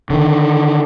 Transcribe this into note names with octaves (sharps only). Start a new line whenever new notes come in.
D3 D#3